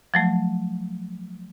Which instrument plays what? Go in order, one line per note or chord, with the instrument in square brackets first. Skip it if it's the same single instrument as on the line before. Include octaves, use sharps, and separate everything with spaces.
[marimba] F3 F#3 A3